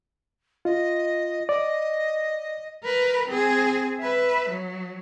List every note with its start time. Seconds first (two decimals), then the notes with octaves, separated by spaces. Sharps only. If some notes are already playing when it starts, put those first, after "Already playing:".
0.65 F4 D#5
1.49 D5 D#5
2.84 A#4 B4
3.28 C4 G#4
4.00 B4 E5
4.49 F#3